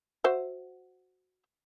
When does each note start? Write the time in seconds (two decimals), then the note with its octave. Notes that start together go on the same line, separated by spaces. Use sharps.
0.24 F#4 C5 E5